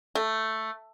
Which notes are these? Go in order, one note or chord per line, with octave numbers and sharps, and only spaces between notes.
A3